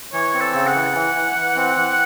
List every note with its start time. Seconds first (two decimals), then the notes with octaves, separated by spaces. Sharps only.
0.13 E3 C#5
0.34 C4
0.40 A4
0.54 C#3
0.67 F#5
0.74 E3
0.94 E3
1.15 E3
1.35 E3
1.56 C4
1.76 E3